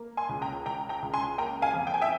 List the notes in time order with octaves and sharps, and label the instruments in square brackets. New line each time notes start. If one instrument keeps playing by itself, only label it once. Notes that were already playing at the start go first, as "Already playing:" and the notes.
Already playing: [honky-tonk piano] A#3
G#5 C6
C#2
G5 A#5
C#2 G5 A#5
G5 A#5
C#2
G#5 C6
A#3 G5 A#5
F5 G#5
F2
G5
G#5
E5 G5